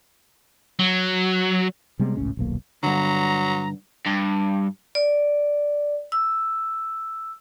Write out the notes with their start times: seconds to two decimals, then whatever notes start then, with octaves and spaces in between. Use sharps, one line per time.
0.80 F#3
1.99 C3 G3 G#3 B3
2.17 G#1 C#2 A2 C#4
2.37 D#1 B1 A#3
2.83 G2 D3 F#3 A#5
4.06 G2
4.95 D5
6.12 E6